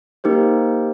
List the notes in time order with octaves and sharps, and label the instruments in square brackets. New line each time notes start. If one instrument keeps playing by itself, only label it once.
[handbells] A#3 D#4 G4 A#4 C5